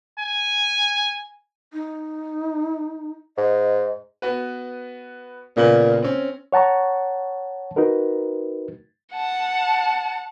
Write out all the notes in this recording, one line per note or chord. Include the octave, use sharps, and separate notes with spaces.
G#5
D#4
G#2 D#5
B3 F#4 B4
A#2 C#3 B3 F#7
C4 C#4
C#5 F#5 A5 A#5 C#6
D#4 F#4 A#4 B4
F#5 A5